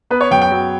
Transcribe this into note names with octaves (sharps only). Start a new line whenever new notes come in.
B3 B4
C#5
F#2 G5
G5
F#3